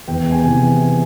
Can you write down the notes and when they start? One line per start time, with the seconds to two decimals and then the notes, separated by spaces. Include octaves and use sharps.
0.08 E2 G5
0.32 G#5
0.43 C3 E3